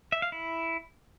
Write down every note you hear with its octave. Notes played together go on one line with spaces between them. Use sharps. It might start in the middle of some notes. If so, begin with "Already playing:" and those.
E5
F5
E4